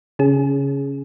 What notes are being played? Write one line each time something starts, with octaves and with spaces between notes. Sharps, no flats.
C#3 C#4 G#4